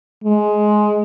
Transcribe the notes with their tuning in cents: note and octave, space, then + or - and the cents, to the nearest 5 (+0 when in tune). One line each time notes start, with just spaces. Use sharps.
G#3 +15